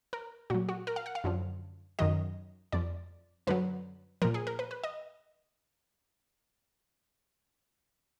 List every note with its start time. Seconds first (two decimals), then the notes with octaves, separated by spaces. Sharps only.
0.13 A#4
0.50 A#2 F#3 F#4
0.69 F#4
0.87 A#4
0.96 F5
1.06 F#5
1.15 F5
1.24 F#2 D3 F3
1.99 F#2 D#3 F#3 D#5
2.72 F2 F3 D5
3.47 F#2 D3 F#3 B4
4.22 A#2 F3 A#4
4.34 G#4
4.47 A#4
4.59 B4
4.71 B4
4.84 D#5